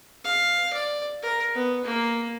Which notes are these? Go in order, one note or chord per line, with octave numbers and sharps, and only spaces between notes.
F5
D5
A#4
B3
A#3